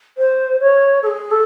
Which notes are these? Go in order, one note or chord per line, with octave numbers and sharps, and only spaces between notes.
C5
C#5
A4
G#4
A4